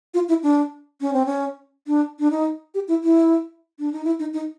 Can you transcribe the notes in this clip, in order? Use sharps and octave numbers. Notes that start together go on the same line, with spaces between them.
F4
E4
D4
C#4
C4
C#4
D4
D4
D#4
G4
E4
E4
D4
D#4
E4
D#4
D#4